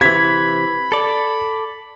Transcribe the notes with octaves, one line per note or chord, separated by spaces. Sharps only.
C3 E3 B5 G#6 B6
A4 D5